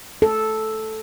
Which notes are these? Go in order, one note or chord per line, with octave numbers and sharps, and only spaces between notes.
A4